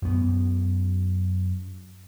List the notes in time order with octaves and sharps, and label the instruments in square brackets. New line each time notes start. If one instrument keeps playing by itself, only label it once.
[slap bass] F#2 B3